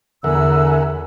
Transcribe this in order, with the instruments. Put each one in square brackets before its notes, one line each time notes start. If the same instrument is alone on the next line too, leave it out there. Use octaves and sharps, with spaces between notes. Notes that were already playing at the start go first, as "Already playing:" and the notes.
[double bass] E2 [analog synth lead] D3 [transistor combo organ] A#4 E5 F#5 [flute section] G#5 E6